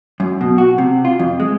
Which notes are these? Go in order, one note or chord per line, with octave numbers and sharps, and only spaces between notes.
F#2
B2
F#4
C3
F4
F2
G#3